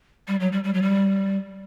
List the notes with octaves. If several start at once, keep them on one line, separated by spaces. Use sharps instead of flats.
G3
F#3
G3
G3
F#3
G3